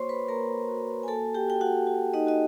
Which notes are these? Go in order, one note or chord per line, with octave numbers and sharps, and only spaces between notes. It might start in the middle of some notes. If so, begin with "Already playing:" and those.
Already playing: A#3 F#4 C5 C#5 C6 C#6
B4 B5
A#3 A#4 A#5
F#4
G#5
A#3 A4 A5
G4 G5
F#4 G5
F#4 F#5
F#4
D#4 D#5
F#4 D#5